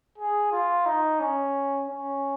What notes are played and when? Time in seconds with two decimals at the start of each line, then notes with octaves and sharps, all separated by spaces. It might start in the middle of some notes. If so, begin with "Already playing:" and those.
0.18 G#4
0.52 F4
0.86 D#4
1.20 C#4
1.88 C#4